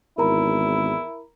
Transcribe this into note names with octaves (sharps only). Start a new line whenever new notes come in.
G#1 E2 E4 A#4 A#5 B5